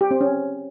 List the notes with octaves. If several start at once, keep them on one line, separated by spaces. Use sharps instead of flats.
G4
C4
C#4